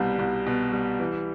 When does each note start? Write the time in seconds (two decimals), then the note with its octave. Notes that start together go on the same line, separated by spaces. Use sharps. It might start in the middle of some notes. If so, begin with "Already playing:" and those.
Already playing: C2 B2 G3
0.19 C2
0.47 B2
0.72 G3
1.00 E3